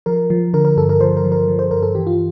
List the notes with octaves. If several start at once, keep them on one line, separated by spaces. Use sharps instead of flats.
F3 A#4
F3
D3 A#4
A#4
G2 A4
A#4
F3 C5
A#4
F3
A#4
F3
C5
G2 A#4
A4
E3 G4
F4